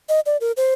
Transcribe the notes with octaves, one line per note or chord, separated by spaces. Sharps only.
D#5
D5
A#4
C5